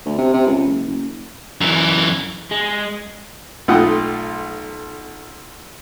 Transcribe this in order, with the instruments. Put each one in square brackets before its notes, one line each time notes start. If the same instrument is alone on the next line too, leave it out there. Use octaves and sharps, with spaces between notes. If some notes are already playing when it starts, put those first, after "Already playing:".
[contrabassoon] D2
C3
C3
C#2
F#1
F#1
[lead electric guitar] F#2 E3
[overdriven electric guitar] G#3
[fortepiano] B1 A3 F4 F#5 G5 D#6